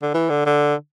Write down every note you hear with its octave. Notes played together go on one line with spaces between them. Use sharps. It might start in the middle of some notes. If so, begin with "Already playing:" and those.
D3
E3
D3
D3